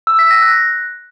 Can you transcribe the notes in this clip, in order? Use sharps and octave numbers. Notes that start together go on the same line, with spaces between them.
E6
B6
A#6
F#6